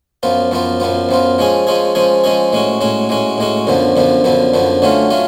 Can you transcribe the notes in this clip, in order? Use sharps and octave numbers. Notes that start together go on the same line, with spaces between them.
F#2 F3 B3 F4
F#2 F3 B3 F4
F#2 F3 B3 F4
F#2 F3 B3 F4
F3 G#3 C#4 G#4
F3 G#3 C#4 G#4
F3 G#3 C#4 G#4
F3 G#3 C#4 G#4
A2 G#3 C#4 F#4
A2 G#3 C#4 F#4
A2 G#3 C#4 F#4
A2 G#3 C#4 F#4
F#2 D3 F3 B3
F#2 D3 F3 B3
F#2 D3 F3 B3
F#2 D3 F3 B3
D3 F#3 A3 C#4 F4
F#3 A3 C#4 F4